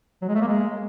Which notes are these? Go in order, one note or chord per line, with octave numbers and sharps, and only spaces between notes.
F#3
G#3
A3
A#3
G#3